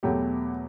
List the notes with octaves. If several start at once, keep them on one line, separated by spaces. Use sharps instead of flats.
E2 B2 F#3 A3 G4